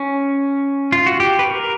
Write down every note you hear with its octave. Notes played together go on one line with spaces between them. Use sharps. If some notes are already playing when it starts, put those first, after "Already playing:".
Already playing: C#4
F4
F#4
G4
B4
A#4